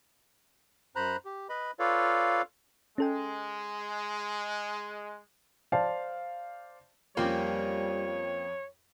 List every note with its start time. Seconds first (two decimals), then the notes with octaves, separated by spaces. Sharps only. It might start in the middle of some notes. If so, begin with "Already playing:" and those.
0.96 F#2 C5 A#5 B5 F#6
1.25 G4
1.49 B4 D#5 B5
1.79 F4 A4 B4 C#5 D5 F5
2.98 G#3 C#4 A4 G5
5.72 C5 D5 F5 A5
7.17 F2 G3 A#3 C4 C#4 C#5